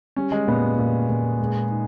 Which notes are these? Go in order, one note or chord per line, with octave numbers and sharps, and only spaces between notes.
G3 C#4
G#3
A#2 B3
A#2
A#2
G#3
D#4